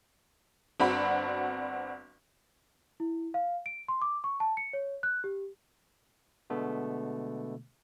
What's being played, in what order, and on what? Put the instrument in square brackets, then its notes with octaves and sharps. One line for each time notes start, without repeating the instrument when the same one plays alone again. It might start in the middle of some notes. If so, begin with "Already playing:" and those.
[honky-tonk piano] G1 C4 D4 F#4 B5
[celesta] E4
F5
D7
C6
D6
C#6
A5
C#7
C#5
F#6
G4
[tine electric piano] B2 D3 G#3 A3 B3